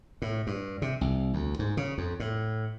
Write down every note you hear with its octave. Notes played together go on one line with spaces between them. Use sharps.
A2
G2
C3
C2
D2
G#2
C#3
F2
A2